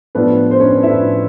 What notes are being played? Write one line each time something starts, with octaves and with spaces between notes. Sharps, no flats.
A2 F3 A3 B3 D4 B4
C5
C#4 C#5
A2 F3 A3 D4 E4 E5